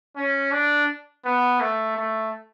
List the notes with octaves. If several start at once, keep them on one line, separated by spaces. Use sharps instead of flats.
C#4
D4
B3
A3
A3